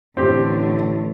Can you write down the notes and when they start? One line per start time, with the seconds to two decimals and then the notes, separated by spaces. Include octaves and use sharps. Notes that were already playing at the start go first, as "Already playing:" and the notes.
0.17 A1 A2 D3 C4 G4